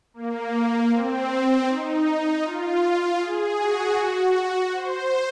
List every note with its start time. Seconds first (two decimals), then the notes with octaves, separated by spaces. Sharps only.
0.14 A#3
0.91 C4
1.67 D#4
2.43 F4
3.19 G#4
3.58 F#4
4.72 C5